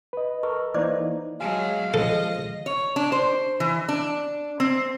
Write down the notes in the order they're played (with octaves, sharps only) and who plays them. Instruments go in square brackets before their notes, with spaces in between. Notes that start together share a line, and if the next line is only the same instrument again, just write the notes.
[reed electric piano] B4 D#5
[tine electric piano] A4 A#4 [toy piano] C#6
[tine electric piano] E3 A#3 D#4 [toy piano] C5 D5 D6
[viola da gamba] F#3 G#3 [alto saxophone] F5 [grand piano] G#5 A5
[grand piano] F3 G#3 [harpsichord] A4 [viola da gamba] D#5
[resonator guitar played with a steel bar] C#5
D4
C5
E3
D4
C4